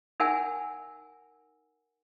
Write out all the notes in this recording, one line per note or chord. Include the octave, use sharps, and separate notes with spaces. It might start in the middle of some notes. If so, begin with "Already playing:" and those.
D#4 A#4 E5 F#5 G#5 A5